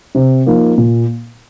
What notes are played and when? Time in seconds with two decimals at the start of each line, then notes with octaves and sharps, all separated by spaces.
0.15 C3
0.46 F3 A#3 D#4
0.78 A#2